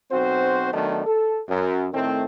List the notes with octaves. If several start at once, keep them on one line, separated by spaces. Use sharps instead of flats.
B1 C4 F#4 C5
D#3 F#3 A3 B3 D4 D#4
A4
F#2
A2 D#3 A3 C4